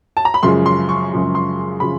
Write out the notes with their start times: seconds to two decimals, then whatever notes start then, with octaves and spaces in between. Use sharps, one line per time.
0.17 A5
0.25 A#5
0.34 B5
0.43 F#2 C#3 F3 G#3 C6
0.66 C6
0.89 C#6
1.12 F#2 C#3 F3 G#3
1.35 C6
1.80 C#3 F3 B5